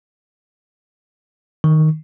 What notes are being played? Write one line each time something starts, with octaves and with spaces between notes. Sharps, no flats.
D#3